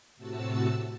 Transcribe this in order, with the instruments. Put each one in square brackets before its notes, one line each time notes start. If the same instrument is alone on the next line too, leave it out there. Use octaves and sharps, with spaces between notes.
[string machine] A2 C3 F#4 A5 E6